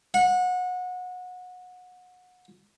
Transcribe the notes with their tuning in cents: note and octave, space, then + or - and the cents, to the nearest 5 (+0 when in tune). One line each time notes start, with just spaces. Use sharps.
F#5 -25